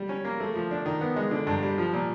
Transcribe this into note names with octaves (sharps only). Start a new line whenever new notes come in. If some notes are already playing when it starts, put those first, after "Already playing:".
Already playing: G3
C#4
A#3
A3
F3
D4
D#3
B3
G#3
D3
G2
G3
F3
A#2